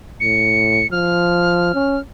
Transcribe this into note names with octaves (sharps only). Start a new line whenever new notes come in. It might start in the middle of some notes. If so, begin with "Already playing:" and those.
A2 C#7
F3 F6
C#4